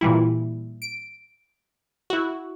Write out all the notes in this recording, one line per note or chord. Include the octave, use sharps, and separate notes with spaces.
A#2 E3 G3 E4
D7
E4 F#4